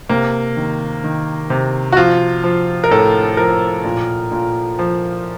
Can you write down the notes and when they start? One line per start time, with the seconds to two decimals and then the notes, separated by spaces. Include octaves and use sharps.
0.09 C3 A#3
0.57 D#3
1.04 D#3
1.50 C3
1.92 F#4
1.97 F3 F4
2.44 F3
2.84 A#4
2.91 A2 A4
3.37 F3 A#4
3.84 A#2
4.31 A#2
4.79 F3